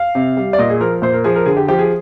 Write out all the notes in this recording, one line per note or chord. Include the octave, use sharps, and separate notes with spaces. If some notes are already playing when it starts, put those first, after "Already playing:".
Already playing: F5
C3
G3
D5
A#2 D#5
G#4
F3 A#4
A#2 C5
A#4
F3 G#4
A#4
D3 G#4
G4
F3 G4
G#4